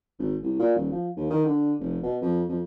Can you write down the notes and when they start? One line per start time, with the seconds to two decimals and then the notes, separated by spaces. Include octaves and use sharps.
0.19 G#1
0.43 C2
0.60 A#2
0.76 D#1
0.92 F3
1.17 D#2
1.30 D#3
1.46 D3
1.80 F1
2.03 B2
2.22 F2
2.49 F2